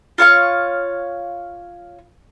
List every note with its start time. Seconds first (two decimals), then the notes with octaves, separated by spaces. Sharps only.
0.18 F4 C#5 F5 C#6